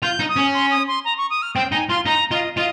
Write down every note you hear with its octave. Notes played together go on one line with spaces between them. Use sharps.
F4 G6
D#4
D#6
C#4
C6
D#6
C6
A#5
C#6
D#6
F6
C4 G5
D#4 G#5
F4 C6
D#4 A#5
F4 D#5
F4 D#5